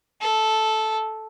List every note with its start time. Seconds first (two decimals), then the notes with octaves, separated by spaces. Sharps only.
0.21 A4